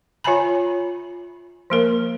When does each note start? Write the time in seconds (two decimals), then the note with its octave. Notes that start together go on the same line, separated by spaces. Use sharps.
0.24 F4 C#5 E5 G#5 A#5 B5
1.70 F3 A#3 A#4